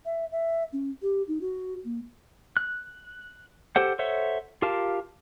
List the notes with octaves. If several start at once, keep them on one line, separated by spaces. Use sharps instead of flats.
E5
E5
C#4
G4
D#4
F#4
A#3
F#6
G4 A4 C5 F#5
A4 C5 C#5 E5 F#5
F4 G4 A#4 F5 A5